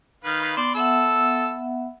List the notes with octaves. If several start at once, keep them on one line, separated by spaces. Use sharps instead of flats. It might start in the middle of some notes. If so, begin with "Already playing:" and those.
D#3 B4 F5
B3 D5 C6
B3 A4 E5 F#5 E6